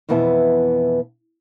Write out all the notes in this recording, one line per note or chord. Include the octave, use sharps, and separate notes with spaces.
F2 B2 E3 B3 E5 A5